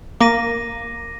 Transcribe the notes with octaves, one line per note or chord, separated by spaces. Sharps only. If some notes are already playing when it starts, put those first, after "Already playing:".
A#3 D6 A#6 D#7